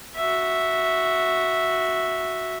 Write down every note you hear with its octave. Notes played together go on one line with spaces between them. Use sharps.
F#4 E5